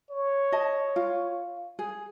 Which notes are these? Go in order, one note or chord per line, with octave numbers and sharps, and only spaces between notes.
C#5
D#5 A5
F4
G#4